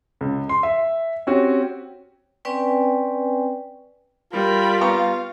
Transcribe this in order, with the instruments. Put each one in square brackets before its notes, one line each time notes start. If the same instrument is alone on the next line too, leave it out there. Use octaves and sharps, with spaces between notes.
[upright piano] C#2
C6
E5
C4 C#4 F#4 G4
[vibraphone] C4 C#4 B4 D5 G5 G#5
[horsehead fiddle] G3 [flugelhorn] F4 [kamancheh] A#4 B5
[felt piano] B3 A#5 C#6 [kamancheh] F5